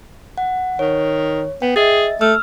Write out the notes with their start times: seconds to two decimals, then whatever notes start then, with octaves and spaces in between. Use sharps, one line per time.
0.38 F#5
0.79 D#3 C#5
1.62 B3 G5
1.76 G#4 D#5 E5 A6
2.21 A3 E6 F6